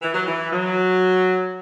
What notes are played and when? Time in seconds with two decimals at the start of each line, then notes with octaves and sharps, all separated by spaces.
0.02 E3
0.14 F#3
0.27 E3
0.52 F#3